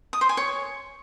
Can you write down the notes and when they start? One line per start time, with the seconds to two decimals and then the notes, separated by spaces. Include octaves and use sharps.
0.13 D#6
0.21 C5
0.29 G#5
0.37 C#5